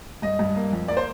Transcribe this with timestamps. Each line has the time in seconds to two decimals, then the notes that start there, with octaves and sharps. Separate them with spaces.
0.22 G2 D#5
0.39 G2
0.56 A#3
0.73 F2
0.88 A#3 D5
0.97 C5